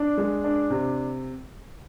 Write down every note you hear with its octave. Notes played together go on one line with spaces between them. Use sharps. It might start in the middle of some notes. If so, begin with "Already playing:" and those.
Already playing: D4
G#3
D4
C3